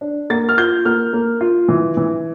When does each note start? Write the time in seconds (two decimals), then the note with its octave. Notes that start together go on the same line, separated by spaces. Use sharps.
0.01 D4
0.30 A#3 A6
0.49 F6
0.58 F4 G6
0.85 A#3 F6
1.13 A#3
1.41 F4
1.68 E3
1.97 E3